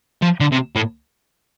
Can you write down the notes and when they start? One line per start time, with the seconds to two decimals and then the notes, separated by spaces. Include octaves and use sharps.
0.22 F3
0.40 D3
0.52 C3
0.75 A2